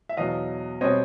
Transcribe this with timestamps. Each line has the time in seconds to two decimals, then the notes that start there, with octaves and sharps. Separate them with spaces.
0.09 E5
0.17 E2 B2 F#3 D#5 F5
0.81 B2 G3 C4 C#5 D#5